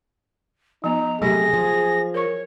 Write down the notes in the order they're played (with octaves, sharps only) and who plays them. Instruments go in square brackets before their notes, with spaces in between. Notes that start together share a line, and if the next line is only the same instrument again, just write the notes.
[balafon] F3 B3 [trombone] D#4 [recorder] A#5
[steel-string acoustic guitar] C3 A3 [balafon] F#3 G4 B5 [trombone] G#4 [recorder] A#6
[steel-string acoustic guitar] F3
[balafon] A#4 C#6 [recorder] C#5